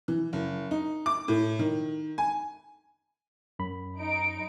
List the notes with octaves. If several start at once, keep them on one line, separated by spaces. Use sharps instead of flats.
E3
F#1
D#4
D6
A2
D#3
G#5
F#2 B5
D#4 D7